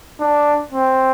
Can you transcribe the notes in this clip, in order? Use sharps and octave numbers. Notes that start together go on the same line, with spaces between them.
D4
C4